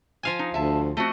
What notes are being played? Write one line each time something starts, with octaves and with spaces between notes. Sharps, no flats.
F3 F5 G#5
D#4
D2 E5 A5
A3 C4 F#4 D#5